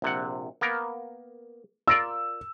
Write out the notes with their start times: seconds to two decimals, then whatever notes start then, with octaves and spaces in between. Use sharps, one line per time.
0.02 A#1 C3 F#5
0.61 A#3 B3 A#4
1.88 F4 A#4 D5 E6